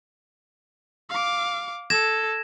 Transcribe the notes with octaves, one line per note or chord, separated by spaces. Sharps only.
F5 D6
A4 G#6 A#6 E7